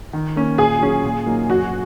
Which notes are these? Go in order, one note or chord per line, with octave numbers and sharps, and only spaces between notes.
D#3
A#3 C#4
A#2 G#4
F#3 C#4
A#2
F#3 A#3 D#4
F#2 F#4